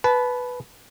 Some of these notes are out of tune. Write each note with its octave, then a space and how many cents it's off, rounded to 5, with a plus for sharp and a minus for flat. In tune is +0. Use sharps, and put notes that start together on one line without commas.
B4 +0 A5 -30